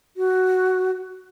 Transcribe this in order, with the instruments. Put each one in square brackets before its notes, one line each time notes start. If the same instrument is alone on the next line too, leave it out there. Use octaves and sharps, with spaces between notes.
[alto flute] F#4